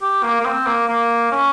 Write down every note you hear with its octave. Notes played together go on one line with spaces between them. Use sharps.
G4
A#3
A#3
C4
A#3
A#3
C#4